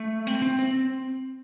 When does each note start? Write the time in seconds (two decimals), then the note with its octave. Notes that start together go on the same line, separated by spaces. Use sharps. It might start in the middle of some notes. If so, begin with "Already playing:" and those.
Already playing: A3
0.27 C4
0.42 C4
0.59 C4